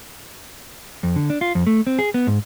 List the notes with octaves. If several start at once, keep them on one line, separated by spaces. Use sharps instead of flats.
F2
D3
D4
F4
F2
A3
C4
G#4
B3
G#2